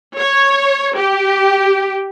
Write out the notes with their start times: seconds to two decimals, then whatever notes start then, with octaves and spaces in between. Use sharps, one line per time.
0.18 C#5
0.96 G4